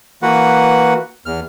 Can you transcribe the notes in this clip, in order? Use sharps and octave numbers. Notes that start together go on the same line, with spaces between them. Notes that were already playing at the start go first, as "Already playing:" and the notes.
E3 A#3 F#4 B4 F#5
E2 F6